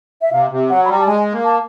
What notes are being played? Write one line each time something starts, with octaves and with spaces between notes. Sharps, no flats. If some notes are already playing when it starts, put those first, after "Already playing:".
E5
C3 F5
C3
F#3 F#5
B5
G3 A#5
A5
G#3 G#5
A#3
A5